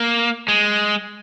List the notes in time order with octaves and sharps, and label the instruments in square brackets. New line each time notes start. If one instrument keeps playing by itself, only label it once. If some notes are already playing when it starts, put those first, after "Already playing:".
Already playing: [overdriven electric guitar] A#3
G#3